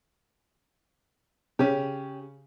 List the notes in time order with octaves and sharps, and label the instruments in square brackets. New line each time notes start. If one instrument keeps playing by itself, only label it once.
[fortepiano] C#3 [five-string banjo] C#4 G4